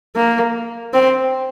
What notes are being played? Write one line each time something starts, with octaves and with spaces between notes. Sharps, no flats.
A#3
C4